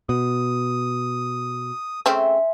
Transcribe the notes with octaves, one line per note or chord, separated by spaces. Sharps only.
B2 D#6
C#3 A3 C4 E5 G#5 C6